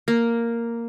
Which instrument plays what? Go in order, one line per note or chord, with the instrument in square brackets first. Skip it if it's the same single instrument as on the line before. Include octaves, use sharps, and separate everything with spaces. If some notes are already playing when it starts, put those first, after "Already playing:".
[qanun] A#3